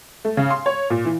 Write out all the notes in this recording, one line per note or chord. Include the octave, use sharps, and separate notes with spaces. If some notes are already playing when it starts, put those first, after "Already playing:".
A3
C#3
C6
C#5
A#2
E3